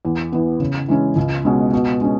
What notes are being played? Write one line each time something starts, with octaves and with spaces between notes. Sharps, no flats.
E2
E3 B3
C#3
E3 G#3 C#4 E4
C#2
B2 G#3 C#4
B2
G#3 C#4